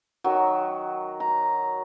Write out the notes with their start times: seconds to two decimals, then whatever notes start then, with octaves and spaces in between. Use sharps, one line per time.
0.24 D#3 F#3
1.20 A#5